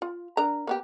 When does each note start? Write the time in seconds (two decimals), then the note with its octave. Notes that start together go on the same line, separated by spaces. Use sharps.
0.02 F4
0.37 D4 A#4 A#5
0.67 A#3 B3 G4